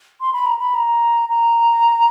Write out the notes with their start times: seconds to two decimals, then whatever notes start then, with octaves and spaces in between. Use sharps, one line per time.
0.21 C6
0.33 B5
0.46 A#5
0.59 B5
0.75 A#5
1.29 A#5